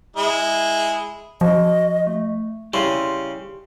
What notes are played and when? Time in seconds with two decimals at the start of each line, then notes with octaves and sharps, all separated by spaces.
0.17 G#3 E4
1.41 F3 F#4 D#5
2.07 A3
2.74 C#3 G3 E4 G4 C6